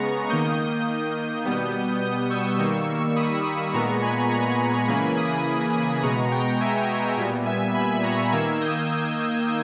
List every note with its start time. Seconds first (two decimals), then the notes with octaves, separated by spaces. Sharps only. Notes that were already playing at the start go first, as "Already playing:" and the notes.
Already playing: C#3 G#3 B3 A#5 C#6
0.29 D#3 A#3 D#6 G6
0.58 D#6 G6
1.45 B2 G3 B3
2.02 D#6 G6
2.30 C#6 E6
2.58 D#3 G3 A#3
3.16 B5 D#6
3.45 B5 D#6
3.74 A#2 G#3 B3 A#5 C#6
4.02 G#5 B5
4.31 A#5 C#6
4.88 C#3 E3 A#3 G#5 B5
5.17 B5 D#6
6.03 B2 G#3 B3 A#5 C#6
6.31 G5 A#5
6.60 E5 G#5
7.17 A#2 G3 B3
7.46 E5 G#5
7.74 G#5 B5
8.03 A#5 C#6
8.32 D#3 A#3 E6 G#6
8.61 D#6 G6